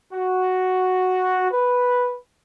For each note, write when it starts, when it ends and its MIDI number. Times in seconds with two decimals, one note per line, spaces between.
0.13 1.50 66
1.52 2.16 71